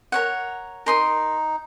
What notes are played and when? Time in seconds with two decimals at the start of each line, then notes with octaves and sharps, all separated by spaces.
0.12 A#4 C#5 F#5
0.86 D#4 A#4 C6 D#6